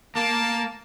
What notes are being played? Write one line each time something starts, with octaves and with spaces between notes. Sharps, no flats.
A#3 A5